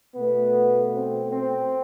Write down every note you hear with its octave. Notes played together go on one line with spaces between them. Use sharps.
B2 A3 B3
C4
C4